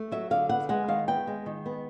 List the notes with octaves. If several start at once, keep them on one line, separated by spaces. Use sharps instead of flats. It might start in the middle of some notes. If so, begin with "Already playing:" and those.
Already playing: A3
F#3 E5
D3 F5
B3 F#5
G#3 F#5
D#3 F5
B3 G5
G#3
D#3
B3